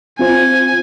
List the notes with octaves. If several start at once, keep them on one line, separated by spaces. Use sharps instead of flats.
C4 F4 C5 G#5